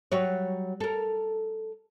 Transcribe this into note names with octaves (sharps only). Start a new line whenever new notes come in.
F#3 G3 C#5
A4 A#4